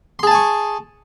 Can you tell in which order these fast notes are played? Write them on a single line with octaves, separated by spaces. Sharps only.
C6 G#4 A5 G#5 C#6